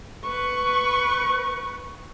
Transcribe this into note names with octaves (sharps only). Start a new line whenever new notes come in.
B4 C#6